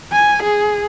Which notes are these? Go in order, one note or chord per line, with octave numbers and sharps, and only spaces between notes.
G#5
G#4